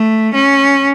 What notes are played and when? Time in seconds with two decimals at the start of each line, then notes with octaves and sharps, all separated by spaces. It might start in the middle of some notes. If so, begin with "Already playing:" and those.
Already playing: A3
0.34 C#4